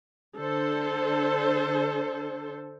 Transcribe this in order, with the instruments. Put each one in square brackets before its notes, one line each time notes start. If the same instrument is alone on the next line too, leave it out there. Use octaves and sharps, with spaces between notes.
[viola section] D3 A4 C5